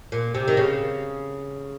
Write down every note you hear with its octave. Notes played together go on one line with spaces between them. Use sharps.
A#2
C3
D#3
C#3